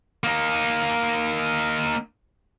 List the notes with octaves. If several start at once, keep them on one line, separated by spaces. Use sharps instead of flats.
A#3 D#4